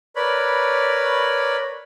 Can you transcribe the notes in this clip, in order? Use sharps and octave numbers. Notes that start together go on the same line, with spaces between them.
A#4 B4 C#5 D5 B5